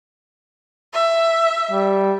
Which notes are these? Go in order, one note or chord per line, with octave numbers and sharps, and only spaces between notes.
E5
G3